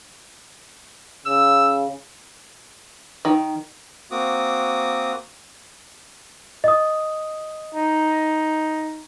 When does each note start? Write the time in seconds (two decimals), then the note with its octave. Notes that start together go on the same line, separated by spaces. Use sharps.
1.26 C#3 E6
3.25 D#3
4.11 A#3 C4 F#4 D6 D#6
6.64 D#5 D#6
7.75 D#4